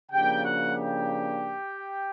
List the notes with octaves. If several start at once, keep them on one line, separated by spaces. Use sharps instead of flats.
C#3 F3 A#3 D4 G4 G5
F#4 F#5
G4 G5